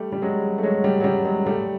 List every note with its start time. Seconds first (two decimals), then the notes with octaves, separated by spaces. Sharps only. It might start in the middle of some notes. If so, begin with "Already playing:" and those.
Already playing: G3 A3
0.12 G3
0.22 F#3 G#3
0.58 A3
0.63 F#3 G#3
0.84 G3
1.00 F#3
1.04 G3
1.25 F#3 G#3
1.46 G3 A3